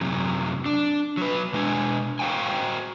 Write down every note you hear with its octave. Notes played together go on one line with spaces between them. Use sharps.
F#2 C3 F#3
D4
F#3 B4
B2 G#3 D4 A4 G#5
F#4 C5 F5 G5 G#5